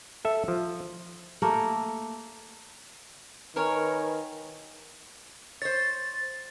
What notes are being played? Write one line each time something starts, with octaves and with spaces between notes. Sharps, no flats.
A4 E5
F3
A3 A#3 A#4
D#3 A#4 B4 C#5 G#5
C5 C#5 A6